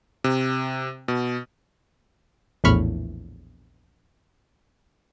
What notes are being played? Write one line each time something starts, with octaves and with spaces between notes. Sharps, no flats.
C3
B2
A#1 E2 A2 B5 C#6 F6